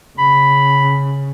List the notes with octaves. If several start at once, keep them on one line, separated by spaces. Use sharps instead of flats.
C#3 B5